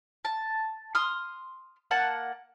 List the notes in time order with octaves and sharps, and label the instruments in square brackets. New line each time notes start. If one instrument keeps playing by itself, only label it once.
[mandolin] A5
C6 D#6 F6
A#3 F#5 A5